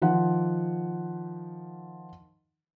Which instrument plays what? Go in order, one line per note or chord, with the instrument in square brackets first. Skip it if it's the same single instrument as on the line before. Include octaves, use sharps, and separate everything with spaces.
[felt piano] D#3 F3 F#5